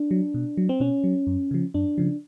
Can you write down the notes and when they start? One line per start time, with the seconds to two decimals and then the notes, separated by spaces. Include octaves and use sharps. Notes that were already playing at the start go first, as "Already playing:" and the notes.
Already playing: D4
0.11 F#3
0.34 B2
0.57 F#3
0.69 C4
0.80 B2 C#4
1.04 F#3
1.27 F#2
1.51 C#3 F3
1.74 F#2 D4
1.98 C#3 F3